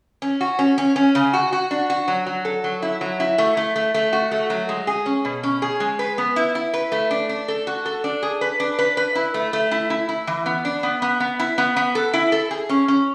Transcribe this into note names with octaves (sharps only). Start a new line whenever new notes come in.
C#4
F#4
C#4
C#4
C#4
C#3
F#4
F#4
D4
F#4
F#3
F#3
A4
F#3
E4
F#3
E4
A3
A3
A3
A3
F#4
A3
F#3
G#3
G#4
C#4
B2
C#4
G#4
G#3
B4
B3
E4
E4
B4
A3
D4
D4
A4
F#4
A4
D4
G#4
B4
D4
B4
B4
E4
A3
A3
E4
E4
E4
E3
B3
D4
B3
B3
B3
E4
B3
B3
A4
E4
A4
G#4
C#4
C#4